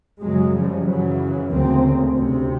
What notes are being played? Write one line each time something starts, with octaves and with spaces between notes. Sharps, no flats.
F#2 C#3 F#3 G#3
F3 G3
F#2 C#3 E3 F#3
D2 C#3 A#3 C4
D2 C3